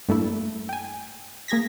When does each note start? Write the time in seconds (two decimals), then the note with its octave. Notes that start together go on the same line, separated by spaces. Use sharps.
0.09 G2 A3 A#3 E4
0.69 G5 G#5
1.48 A#3 G#4 G#6 A#6 B6